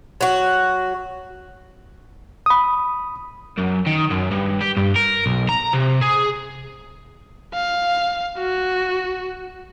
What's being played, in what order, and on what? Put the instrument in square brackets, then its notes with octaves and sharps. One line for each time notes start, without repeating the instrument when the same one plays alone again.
[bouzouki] F#3 F#4
[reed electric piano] B5 D#6
[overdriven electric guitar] F#2
D#3
F#2
G2
G4
G2
A#4
B1
A#5
C3
G#4
[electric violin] F5
F#4